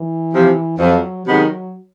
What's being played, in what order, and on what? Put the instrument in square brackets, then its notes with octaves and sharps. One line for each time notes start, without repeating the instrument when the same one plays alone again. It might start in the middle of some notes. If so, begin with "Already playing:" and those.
Already playing: [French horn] E3
[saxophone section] C3 F3
[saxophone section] F2 [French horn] F#3
[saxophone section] C3 D#3 G#3 B3 [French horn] F#3